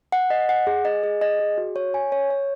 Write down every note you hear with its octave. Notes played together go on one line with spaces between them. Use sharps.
F#5
D#5
F#5
G#4
D#5
G#4
D#5
G#4
F#4
C#5
G#5
C#5
C#5